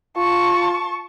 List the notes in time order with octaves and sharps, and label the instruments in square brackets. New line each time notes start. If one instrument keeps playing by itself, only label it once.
[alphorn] F4 [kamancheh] A5 C#6